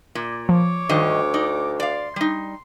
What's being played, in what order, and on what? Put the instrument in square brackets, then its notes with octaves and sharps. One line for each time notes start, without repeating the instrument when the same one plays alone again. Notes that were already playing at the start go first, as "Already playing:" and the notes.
[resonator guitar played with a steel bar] A#2
[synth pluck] F3 [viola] C#5 D6
[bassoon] D2 [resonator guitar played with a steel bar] G2 D#3 D#5
[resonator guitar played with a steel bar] D#4 D5
[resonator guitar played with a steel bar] D5 F5 [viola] C6
[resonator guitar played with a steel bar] G3 D#4